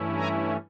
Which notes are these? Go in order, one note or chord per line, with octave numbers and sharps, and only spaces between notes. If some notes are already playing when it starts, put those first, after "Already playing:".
Already playing: G2 E3 A3 C#4 E4
G#5 A#5